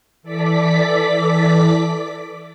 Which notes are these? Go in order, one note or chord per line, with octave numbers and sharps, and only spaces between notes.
E3 A4 D5 D6 B6